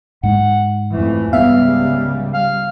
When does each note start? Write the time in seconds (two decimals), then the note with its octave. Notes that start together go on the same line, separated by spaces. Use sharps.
0.23 G#2 G#3 F#5
0.93 F2 E3 A3
1.33 C#2 G3 B3 E5 F5
2.34 F5